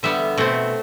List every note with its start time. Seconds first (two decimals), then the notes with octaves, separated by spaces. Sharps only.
0.03 D3 G3 B3 E5
0.37 B2 A3 C4